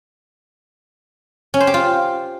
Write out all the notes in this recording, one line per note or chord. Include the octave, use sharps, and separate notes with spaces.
C#4
C5
G4
F4